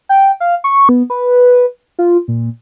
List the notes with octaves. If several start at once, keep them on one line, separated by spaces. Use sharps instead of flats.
G5
F5
C#6
B3
B4
F4
A#2